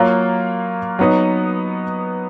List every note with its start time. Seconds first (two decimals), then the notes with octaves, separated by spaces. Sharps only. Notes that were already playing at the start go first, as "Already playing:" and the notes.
Already playing: F#3 A#3 F4
0.99 F#3 B3 D#4